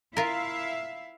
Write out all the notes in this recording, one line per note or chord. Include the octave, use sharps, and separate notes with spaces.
E4 F4 A#4 E5 F5